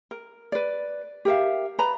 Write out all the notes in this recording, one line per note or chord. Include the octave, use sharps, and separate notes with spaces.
A#4
B4 D5
G4 A#4 E5 F5
B4 D5 A#5 B5